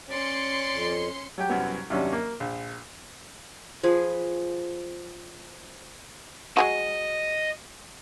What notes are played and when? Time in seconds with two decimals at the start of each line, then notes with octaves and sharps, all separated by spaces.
0.11 C#4 D5 C6 C#7
0.71 F2
1.38 F#3 G4 G5
1.49 C2 F#2 F#3 B3
1.90 D#2 C3 F#3 C#4 D4
2.13 A#3
2.40 A#1
3.83 F3 G#4 B4
6.57 F#3 G#3 F#4 D#5